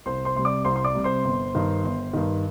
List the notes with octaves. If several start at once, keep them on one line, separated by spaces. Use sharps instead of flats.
C2 C5 C6
C5 C6
C3 G3 C6
D5 D6
C2 C5 C6
C6
D5 D6
C3 G3
C5 C6
G1
G2 D#3
G1
G2 D#3